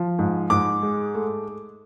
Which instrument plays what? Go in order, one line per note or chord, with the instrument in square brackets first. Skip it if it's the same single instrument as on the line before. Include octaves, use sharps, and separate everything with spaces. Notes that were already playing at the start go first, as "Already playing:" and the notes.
Already playing: [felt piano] F3
G#2
[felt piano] G#2 [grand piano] D6
[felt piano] G#3
A3